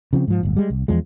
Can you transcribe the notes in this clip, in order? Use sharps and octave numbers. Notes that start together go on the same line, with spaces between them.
C#3 F3 C4
G#2 F3
D1 G1
G3 G#3
C2
E2 F3 G#3